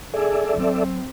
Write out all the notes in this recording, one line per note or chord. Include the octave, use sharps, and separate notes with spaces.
G#4 A4 D5 E5
F#3 C4